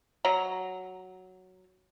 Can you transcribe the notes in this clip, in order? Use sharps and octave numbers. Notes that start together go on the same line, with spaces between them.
F#3 A#5